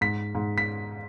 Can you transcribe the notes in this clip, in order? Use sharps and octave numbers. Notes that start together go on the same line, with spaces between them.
G#2 B6
G#2
B6